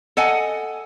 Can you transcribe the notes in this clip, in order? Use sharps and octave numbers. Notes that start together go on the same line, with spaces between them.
A4 D#5 F#5 G#5